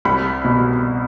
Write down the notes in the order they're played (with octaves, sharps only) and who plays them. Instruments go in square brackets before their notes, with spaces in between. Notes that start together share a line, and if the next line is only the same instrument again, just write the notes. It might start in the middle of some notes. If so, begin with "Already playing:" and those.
[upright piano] C2 B5
B2